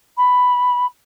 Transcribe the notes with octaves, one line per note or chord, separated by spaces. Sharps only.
B5